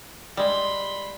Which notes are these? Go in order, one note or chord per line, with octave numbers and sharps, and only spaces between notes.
G3 G#3 B5 C6